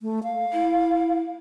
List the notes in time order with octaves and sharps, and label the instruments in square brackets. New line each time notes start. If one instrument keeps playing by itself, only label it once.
[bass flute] A3
F5
[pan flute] E4